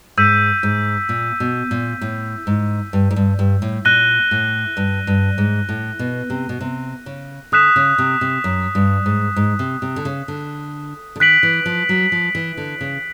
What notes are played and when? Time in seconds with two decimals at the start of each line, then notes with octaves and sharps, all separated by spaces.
0.17 G#2 E6 G6 B6 D#7
0.63 G#2
1.09 A#2
1.40 B2
1.71 A#2
2.01 A2
2.47 G#2
2.93 G2
3.11 G#2
3.16 G2
3.39 G2
3.62 A2
3.85 A#2 F#6 A#6 D#7 G7
4.31 A2
4.77 G2
5.07 G2
5.38 G#2
5.69 A2
5.99 B2
6.30 C3
6.49 B2
6.61 C3
7.06 C#3
7.52 D3 D#6 F#6 B6 E7
7.76 C#3
7.98 C3
8.21 C3
8.44 F#2
8.75 G2
9.06 G#2
9.36 G#2
9.59 C3
9.82 C3
9.96 D3
10.05 C#3
10.28 D3
11.16 D3
11.20 D#3 F#6 B6 D7 F#7
11.43 E3
11.66 F3
11.89 F#3
12.12 F3
12.35 E3
12.57 D3
12.81 C#3